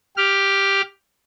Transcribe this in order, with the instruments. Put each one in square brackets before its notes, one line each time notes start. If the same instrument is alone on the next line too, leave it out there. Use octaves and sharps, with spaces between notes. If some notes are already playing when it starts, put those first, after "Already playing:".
[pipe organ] G4 F6